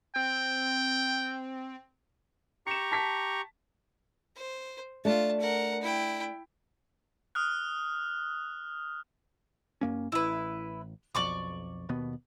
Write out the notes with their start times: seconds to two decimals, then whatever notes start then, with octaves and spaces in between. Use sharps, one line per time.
0.16 C4 G5
2.67 G4 A#5 C#6 C#7 E7
2.92 A5 B6
4.36 C5
5.05 A3 D4 F4 A5
5.41 A#4 F#5
5.82 E4 G5
7.35 D#6 F6 F#6
9.81 F#2 A#3 C#4
10.12 A1 E4 B4
11.15 B1 F2 D5 C#6 D6
11.89 D#2 B2 B3